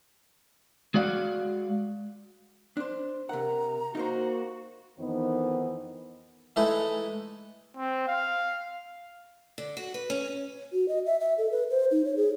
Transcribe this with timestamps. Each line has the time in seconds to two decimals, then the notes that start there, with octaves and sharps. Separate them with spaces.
0.94 G#3 F#4 D5 F5 F#5
2.77 D4 C5
3.29 C3 A#4 F#5 A#5
3.95 A#3 D#4 F#4 A#4 C5
4.99 F2 D#3 E3 B3 D#4 C5
6.56 E3 G#3 A3 D#4 E4 A4
7.77 C4
8.07 F5
9.58 D3
9.77 F#4
9.94 B4
10.10 C#4
10.73 F#4
10.88 D#5
11.06 E5
11.20 E5
11.38 A4
11.51 B4
11.70 C5
11.91 D#4
12.05 C#5
12.16 G#4